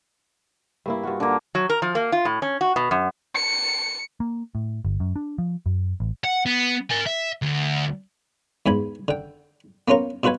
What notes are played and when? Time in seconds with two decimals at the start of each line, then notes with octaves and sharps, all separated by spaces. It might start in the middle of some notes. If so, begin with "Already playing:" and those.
0.86 G2 A#3 E4
1.03 G2 F4 F#4
1.20 D3 A#3
1.55 F#3
1.70 A#4
1.82 F3
1.95 A#3
2.12 F4
2.25 A2
2.42 C#4
2.61 F#4
2.76 B2
2.91 F#2
3.35 C#7
4.20 A#3
4.55 A2
4.85 G1
5.00 F#2
5.16 D4
5.38 F3
5.66 F#2
6.00 A1
6.25 F#5
6.46 B3
6.90 A#4 G#5
7.06 E5
7.42 D2
8.66 E2 G#2 G#5 B5
9.08 D3 G5
9.88 A#3 B3 C#4 F4 A#4
10.23 B2 F4 F#4 B4 G#5